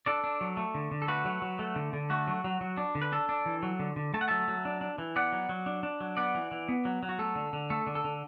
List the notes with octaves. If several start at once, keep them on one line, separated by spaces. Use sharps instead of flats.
D4 A4 D5
D4
F#3
A3
D3
D3
A4
A3 F#4 B4
F#3
F#3
A3
D3
D3
A3 F#4
F#3
F#3
F#3
D4
D3
B4
D4 A4
D4
E3
F#3
D3
D3
A3 A5
F#5
F#3 E5 A5
F#3
D4
D4
E3
B3 D5 F#5
F#3
F#3
D4
D4
F#3
B3 D5 F#5
E3
E3
B3
F#3
F#3
F#4
A3 A4
D3
D3
A3 A4
D3
A4
D3